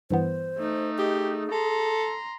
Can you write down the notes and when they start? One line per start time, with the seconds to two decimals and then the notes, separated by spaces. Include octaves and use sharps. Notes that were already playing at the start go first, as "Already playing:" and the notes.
0.10 G2 E3 B3 C5
0.59 A3 D#4
0.98 G4 G#4 D#5
1.52 A4 A#5 C6